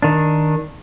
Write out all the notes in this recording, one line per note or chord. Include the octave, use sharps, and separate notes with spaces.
D#3 D4